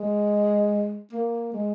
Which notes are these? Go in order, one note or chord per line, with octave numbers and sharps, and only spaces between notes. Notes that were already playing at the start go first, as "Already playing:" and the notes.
Already playing: G#3
A#3
G#3